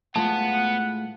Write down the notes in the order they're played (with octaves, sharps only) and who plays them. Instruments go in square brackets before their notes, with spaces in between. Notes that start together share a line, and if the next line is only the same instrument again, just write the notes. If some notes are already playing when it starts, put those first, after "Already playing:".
[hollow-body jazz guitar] A2 G#3 F4 [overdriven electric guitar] B3 [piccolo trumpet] F#5 [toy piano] A5